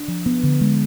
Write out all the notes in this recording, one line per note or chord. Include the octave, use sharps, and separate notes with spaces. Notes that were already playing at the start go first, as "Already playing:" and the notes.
Already playing: D4
F3
B3
D3
G#3